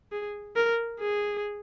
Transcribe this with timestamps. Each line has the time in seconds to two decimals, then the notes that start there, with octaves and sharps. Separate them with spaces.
0.12 G#4
0.56 A#4
1.00 G#4